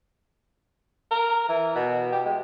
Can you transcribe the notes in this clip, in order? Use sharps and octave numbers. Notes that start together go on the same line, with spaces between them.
A#4
E3
B2
G4
G#3